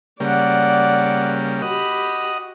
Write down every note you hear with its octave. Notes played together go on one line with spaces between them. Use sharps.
C#3 G3 A#3 D5 F#5
F#4 G4 D#5 B5